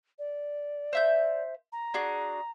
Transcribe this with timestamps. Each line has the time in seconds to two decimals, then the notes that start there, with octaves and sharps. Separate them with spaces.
0.19 D5
0.93 C5 E5 G6
1.72 A#5
1.94 D4 F#4 G#4